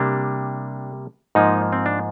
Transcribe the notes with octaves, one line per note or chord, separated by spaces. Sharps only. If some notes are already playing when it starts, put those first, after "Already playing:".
Already playing: C3 G3 A#3 D4
G#2 F3 A#3 D#4
C4
D4